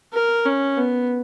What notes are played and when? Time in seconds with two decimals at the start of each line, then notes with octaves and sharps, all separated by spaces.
0.13 A#4
0.46 C#4
0.77 B3